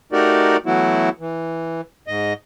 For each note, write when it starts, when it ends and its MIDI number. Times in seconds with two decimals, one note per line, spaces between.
0.12 0.57 57
0.12 0.57 63
0.12 0.57 66
0.12 0.57 67
0.12 0.57 70
0.12 0.57 74
0.66 1.09 52
0.66 1.09 54
0.66 1.09 57
0.66 1.09 59
0.66 1.09 64
0.66 1.09 66
1.20 1.81 52
2.08 2.33 44
2.08 2.33 75